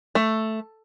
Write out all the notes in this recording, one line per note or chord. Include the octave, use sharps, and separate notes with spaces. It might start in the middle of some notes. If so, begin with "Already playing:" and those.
A3